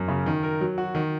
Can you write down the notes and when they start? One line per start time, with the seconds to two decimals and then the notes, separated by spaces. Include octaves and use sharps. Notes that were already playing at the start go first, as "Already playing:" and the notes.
Already playing: F#2
0.08 C#3
0.26 D#3
0.43 A#4
0.61 F#3
0.78 F#4
0.95 D#3